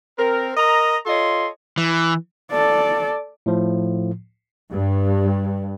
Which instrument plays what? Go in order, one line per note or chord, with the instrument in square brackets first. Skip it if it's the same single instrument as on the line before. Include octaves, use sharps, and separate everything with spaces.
[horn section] C4 A#4
A#4 D#5 A#5
F4 A4 C#5 D#5 C6
[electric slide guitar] E3
[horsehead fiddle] A4 D5
[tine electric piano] A2 F3
[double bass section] G2